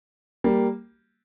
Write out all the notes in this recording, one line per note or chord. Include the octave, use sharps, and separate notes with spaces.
G3 A#3